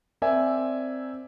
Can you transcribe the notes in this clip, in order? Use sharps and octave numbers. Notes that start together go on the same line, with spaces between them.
C4 A#4 D5 E5 G#5